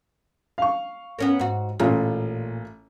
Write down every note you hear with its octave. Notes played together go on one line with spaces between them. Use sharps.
F5 C#6
B3 C#4 A#4
G#2 F#4
A1 A#2 F4